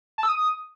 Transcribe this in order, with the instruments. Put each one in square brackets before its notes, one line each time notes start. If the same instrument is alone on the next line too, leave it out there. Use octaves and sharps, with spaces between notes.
[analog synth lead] A5
E6
D#6